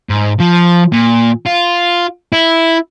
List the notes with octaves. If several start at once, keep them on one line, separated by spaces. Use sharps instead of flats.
G#2
F3
A#2
F4
E4